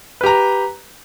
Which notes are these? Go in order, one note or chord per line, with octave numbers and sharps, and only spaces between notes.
G4 B4 A#5